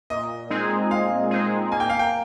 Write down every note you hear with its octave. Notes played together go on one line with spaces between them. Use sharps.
A#2 D#5
G#3 C4 D#4 G#4
A#2 F5
G#3 C4 D#4 G#4
A#3 G#5
G5
F5
G5